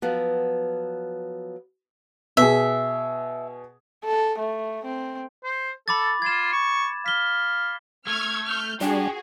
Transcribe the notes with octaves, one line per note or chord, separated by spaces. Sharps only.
F3 F#3 B3
B2 G#4 E5
A4
A3
C4
C5
A4 B5 D6 A6
F4 G#6 E7
C#6
F5 B6 G7
A3 C#6 E6 F6 G#6
F6 G6
G3 D4 F4 F#4 G#4 G5